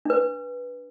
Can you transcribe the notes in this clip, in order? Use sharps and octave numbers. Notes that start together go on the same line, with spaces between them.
D4 B4